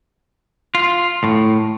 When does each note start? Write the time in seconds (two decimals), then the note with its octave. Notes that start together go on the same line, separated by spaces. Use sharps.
0.75 F4
1.24 A2